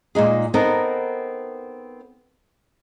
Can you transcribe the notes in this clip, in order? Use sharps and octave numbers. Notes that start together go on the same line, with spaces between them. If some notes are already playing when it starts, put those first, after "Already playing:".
A#2 G#3 D#4 G#4
B3 C4 D#4 A4 A#4